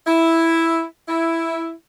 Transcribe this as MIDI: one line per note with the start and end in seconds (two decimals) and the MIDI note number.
0.07 0.84 64
1.08 1.71 64